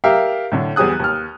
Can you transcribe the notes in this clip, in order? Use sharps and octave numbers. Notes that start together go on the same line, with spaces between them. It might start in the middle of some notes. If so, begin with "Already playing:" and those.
G4 A#4 E5 F5
A2 D3
E2 G3 G#4 D#6 F#6
D#2 F6